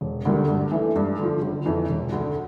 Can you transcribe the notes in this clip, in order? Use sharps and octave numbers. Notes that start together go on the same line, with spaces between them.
E1
D2 D3 G3 A#3
G2
E3 A3 E4
G2
D3 F3
G1
F2 E3
E1
D2 D3